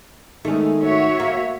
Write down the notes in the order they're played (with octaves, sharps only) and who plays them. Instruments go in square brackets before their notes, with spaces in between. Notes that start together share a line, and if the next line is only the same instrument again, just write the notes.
[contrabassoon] D#3 [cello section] G#3 B3 G#4 [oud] A3 C#4
[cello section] F#4 C#5 E5
[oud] A#3